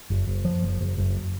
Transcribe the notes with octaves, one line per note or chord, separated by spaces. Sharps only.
F#1
F#1
F3
F#1
F#1
F#1